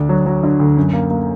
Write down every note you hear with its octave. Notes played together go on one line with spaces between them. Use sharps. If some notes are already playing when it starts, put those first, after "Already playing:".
Already playing: D2 D4
F#3
F#3
D3
D2
F#2
A#3
A#3